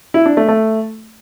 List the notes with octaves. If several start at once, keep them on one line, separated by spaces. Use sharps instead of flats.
E4
D4
A3
A3